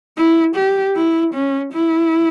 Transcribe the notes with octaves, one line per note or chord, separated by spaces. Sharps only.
E4
G4
E4
C#4
E4